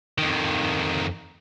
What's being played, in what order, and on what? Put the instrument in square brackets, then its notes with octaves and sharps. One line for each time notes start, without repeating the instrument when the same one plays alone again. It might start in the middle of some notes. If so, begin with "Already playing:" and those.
[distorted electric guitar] F2 D#3